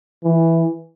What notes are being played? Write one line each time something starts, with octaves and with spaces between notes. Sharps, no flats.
E3